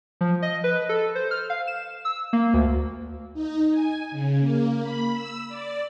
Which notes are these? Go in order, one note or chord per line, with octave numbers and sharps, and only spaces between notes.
F3
D#5
B4
A4
C5
F6
F5
E7
E6
A#3
D2
D#4
G#5
C#3
A#3
B5
E6
D5